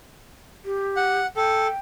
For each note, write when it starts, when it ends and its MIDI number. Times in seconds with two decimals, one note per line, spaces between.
0.65 1.20 67
0.96 1.26 78
1.37 1.67 69
1.37 1.79 79